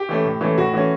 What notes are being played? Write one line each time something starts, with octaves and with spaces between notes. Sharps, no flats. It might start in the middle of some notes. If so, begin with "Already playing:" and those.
Already playing: G4
E3 A3 C#4
A2
E3 A3 C#4
A2 F#4
E3 A3 C#4